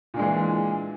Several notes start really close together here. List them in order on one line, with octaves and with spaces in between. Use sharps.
A#2 D4 G#3 E3